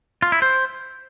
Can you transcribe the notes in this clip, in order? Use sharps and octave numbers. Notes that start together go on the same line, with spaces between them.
F4
E4
C5